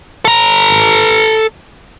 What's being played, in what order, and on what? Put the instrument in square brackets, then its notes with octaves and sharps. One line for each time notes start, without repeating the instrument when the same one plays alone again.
[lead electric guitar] A4 A#5